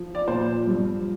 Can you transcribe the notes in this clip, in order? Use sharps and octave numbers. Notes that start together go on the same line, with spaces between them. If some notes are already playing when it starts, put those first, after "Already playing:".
Already playing: F3
D5
A#2 F3 C5
G2 F3